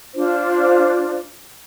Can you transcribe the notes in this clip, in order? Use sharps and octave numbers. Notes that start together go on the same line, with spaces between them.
D4 F4 C5